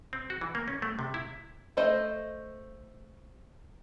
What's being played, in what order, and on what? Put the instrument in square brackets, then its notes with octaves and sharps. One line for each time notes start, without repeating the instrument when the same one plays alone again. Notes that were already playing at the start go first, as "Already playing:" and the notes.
[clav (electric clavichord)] C4
F#4
E3
A#3
C#4
A3
C3
E4
[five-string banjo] A3 C5 D#5